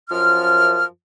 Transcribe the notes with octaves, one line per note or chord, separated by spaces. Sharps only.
F#2 F3 F6